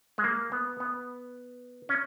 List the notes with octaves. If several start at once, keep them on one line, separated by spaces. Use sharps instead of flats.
G#3
A#3
B3
B3
C#4